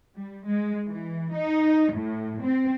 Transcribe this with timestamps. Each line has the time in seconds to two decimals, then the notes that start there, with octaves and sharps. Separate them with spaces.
0.18 G3
0.48 G#3
0.88 E3
1.34 D#4
1.94 A2
2.44 C4